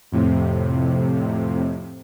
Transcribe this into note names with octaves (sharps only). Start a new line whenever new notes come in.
F2 A2 C3